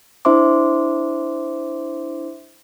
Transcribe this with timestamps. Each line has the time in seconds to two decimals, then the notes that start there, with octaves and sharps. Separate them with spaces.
0.25 D4 E4 C5 E5 C6 D6